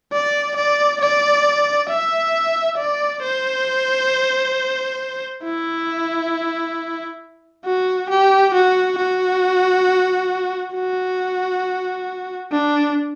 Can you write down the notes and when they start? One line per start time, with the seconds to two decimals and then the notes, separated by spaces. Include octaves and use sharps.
0.13 D5
0.57 D5
1.01 D5
1.90 E5
2.78 D5
3.23 C5
5.44 E4
7.66 F#4
8.10 G4
8.54 F#4
8.98 F#4
10.75 F#4
12.52 D4